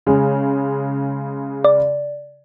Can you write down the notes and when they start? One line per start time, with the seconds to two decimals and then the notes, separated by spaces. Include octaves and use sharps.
0.07 C#3 G#3
1.65 D5